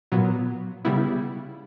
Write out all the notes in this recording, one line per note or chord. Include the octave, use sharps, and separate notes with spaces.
A#2 F#3 B3
C#3 G3 B3 E4